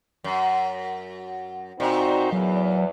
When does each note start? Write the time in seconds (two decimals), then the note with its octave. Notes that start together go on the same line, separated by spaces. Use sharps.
0.24 F#2
1.80 A#2 C4 D#4 F#4
2.32 E2 F#3